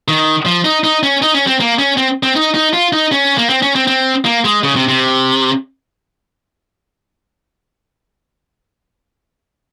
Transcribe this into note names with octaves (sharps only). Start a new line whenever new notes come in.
D#3
F3
D#4
D#4
C#4
D#4
C#4
C4
A#3
C#4
C4
C4
D#4
D#4
F4
D#4
C#4
A#3
C4
C#4
C4
C4
A#3
G#3
C#3
C3
C3